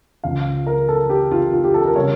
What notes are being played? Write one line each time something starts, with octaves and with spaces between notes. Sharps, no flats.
C#2 C#3 F3 F5
A#4
A4
G4
F4
F4
G4
A4
A#4
C#3 G3 C#5